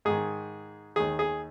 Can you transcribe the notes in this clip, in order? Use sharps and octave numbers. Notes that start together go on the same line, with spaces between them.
G#2 D#3 G#4
D#2 D#3 G#4
G#4